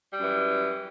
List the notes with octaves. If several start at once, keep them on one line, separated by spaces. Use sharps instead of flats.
F#2 E3 G3